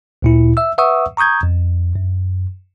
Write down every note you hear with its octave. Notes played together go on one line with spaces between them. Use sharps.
D2 A#2 E4
E5 E6
B4 E5 F#5 C#6 D#6 E6
A#5 C#6 D#6 G6 G#6
F2
F#2